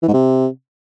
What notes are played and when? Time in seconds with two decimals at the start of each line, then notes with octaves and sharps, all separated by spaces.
0.03 E3
0.08 G#2
0.13 C3